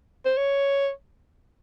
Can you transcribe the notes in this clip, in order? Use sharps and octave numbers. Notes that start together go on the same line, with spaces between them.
C5
C#5